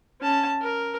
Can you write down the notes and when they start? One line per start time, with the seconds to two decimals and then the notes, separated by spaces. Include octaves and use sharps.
0.21 C#4 A5
0.62 A#4